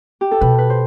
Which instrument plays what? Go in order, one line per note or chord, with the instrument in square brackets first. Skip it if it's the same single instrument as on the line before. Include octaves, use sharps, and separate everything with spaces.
[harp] G4
A4
[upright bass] B2 [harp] B4
[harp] B4
C5